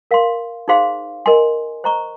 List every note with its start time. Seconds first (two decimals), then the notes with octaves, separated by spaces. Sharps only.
0.11 A#4 F5 C6
0.68 D#4 G#4 C5 F5 C6
1.26 A#4 D#5 G#5 C6
1.84 C5 D#5 A#5 C#6